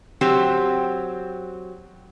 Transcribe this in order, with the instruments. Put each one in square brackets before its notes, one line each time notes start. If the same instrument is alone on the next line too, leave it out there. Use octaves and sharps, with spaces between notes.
[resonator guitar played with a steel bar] F#3 C4 G4